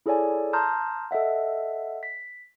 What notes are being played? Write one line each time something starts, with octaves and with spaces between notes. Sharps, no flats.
E4 G#4 A4 C#5 D5 G#5
A5 A#5 C6 D#6 F6 G6
A4 D#5 E5 F#5
B6